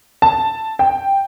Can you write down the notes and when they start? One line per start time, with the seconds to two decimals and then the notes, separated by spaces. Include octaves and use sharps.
0.22 A5
0.79 G5